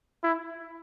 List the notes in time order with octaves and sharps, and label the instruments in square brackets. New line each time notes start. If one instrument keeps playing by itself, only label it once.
[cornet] E4